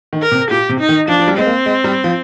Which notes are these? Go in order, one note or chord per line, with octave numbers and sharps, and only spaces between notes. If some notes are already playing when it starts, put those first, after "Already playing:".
D#3
A#4
C3
A#2 G4
C3
D#4
D#3
F3 D4
F3
G3
G#3 C4
A#3
G#3
G3
F3